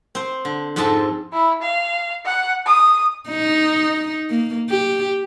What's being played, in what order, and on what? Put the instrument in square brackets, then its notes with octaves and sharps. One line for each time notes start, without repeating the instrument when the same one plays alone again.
[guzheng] C4 C5
D3
F2 G#2 G#3 C4 A4 A5
[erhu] E4
F5
F#5
D#6
[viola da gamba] D#4
A#3
G4